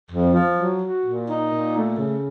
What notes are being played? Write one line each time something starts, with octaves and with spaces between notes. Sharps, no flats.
F2
F3
F#3
F#4
A#2
D#4
A#2
A3
C#3